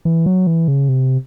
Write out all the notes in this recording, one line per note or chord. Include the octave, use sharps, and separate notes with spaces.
E3
F#3
E3
C#3
C3